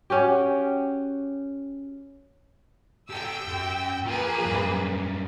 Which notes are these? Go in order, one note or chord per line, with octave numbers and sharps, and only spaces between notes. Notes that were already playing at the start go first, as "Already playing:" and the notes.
C#4 F#4 G4
G4 A4 G5 E6
F#2
F3 A#3 G#4 B4
F#2 G3